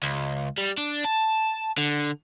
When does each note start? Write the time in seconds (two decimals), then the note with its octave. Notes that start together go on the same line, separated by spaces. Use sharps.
0.03 C#2
0.58 G3
0.78 D4
1.04 A5
1.78 D3